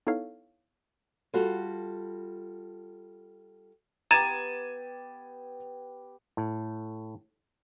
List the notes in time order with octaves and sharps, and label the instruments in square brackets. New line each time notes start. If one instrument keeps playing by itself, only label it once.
[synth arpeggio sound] B3 D#4 E4 A4 C#5 F5
[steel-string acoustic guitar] G3 F4 F#4 A4
[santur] B3 G4 [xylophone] A#5 [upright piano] G#6 D#7 E7 [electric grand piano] A6
[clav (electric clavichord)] A2